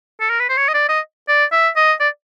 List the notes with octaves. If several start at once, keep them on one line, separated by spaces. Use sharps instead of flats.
A4
A#4
B4
C5
C#5
D#5
D5
D#5
D5
E5
D#5
D5